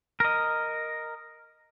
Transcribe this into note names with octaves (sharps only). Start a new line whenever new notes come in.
A#4 D#5